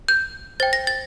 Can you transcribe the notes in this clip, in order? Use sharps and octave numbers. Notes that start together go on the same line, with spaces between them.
G6
C5 G5 A6
A#6
A6